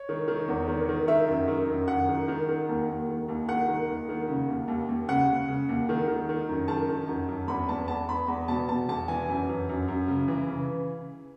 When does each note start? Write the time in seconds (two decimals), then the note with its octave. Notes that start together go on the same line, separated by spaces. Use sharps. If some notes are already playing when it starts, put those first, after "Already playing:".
Already playing: C#5
0.09 D#3
0.28 D#3
0.48 E2
0.68 D#3
0.89 D#3
1.08 D#3 E5
1.28 F#2
1.48 D#3
1.68 F#2
1.88 F#2 F#5
2.09 D#3
2.28 D#3
2.49 D#3
2.69 D#2
2.89 D#2
3.09 D#3
3.28 D#2
3.48 D#3 F#5
3.68 D#3
3.89 D#2
4.09 D#3
4.28 C#3
4.48 D#2
4.68 D#2
4.89 D#2
5.08 C#3 F#5
5.29 C#3
5.48 C#3
5.69 D#2
5.89 D#3
6.08 D#3
6.29 D#3
6.49 F#2
6.68 D#3 A5
6.89 D#3
7.08 F#2
7.28 F#2
7.48 E2 B5
7.69 E2 A5
7.88 E2 A5
8.08 E2 B5
8.28 E2
8.48 B2 A5
8.68 B2 A5
8.88 E2 A5
9.08 E3 G#5
9.28 F#2
9.49 F#2
9.69 F#2
9.88 F#2
10.08 C#3
10.28 E3
10.48 C#3